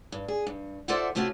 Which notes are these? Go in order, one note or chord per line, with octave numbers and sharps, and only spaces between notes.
G2
G#4
G2
F4 A4 C5 D5 E5 F#5
C3 A3 C#4 F4 F#4